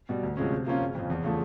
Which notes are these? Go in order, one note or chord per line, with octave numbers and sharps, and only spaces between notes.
B2 G3
D2
C3 F3 G#3 C#4
C3
F3 A#3 C#4 F4
F#1
F2 C#3 F3
E2
C#3 F3 A3